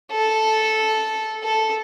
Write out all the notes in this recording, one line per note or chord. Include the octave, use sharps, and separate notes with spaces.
A4
A4